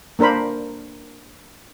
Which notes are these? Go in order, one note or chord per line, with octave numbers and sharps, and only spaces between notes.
A#3 D4 A#4 C5 B5